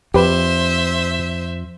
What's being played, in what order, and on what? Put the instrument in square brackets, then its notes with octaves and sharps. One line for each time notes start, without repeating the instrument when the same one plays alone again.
[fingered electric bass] F2 [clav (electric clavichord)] G4 B4 [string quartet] C5 E5